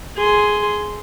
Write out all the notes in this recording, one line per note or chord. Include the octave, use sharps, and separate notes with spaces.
G#4 C6